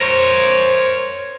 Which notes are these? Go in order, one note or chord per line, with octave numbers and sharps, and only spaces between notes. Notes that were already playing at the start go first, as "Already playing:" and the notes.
A#4 C5 C#5